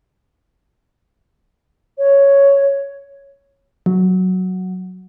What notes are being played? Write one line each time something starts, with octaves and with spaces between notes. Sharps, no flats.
C#5
F#3